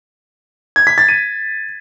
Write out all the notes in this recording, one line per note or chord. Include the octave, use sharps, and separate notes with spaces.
G#6
B6
A6
D#7